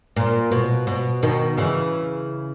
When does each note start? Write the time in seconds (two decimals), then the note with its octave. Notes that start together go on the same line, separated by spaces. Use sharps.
0.16 A#2
0.52 B2
0.87 B2
1.23 B2 D#3
1.57 C#3 E3